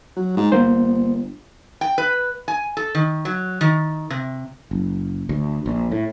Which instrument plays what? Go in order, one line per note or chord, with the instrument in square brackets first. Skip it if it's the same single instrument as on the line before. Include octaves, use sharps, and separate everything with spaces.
[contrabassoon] F#3
G#2
[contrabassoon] G1 [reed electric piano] A#3 C5
[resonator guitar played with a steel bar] G5
B4
G#5
A4
D#3
F#3
D#3
C3
[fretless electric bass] F#1
D2
A#1
A2